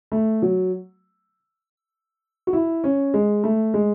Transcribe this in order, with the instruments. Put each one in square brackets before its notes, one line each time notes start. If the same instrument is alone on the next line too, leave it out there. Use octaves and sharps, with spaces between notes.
[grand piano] A3
F#3
F#4
E4
C#4
G#3
A3
G#3